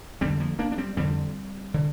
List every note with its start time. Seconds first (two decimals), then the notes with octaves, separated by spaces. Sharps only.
0.21 F2 D3 G3 C4
0.40 F3 A#3
0.59 A#3 D4
0.72 D4
0.78 G3 C4
0.96 F2 D3 G3 C4
1.74 D3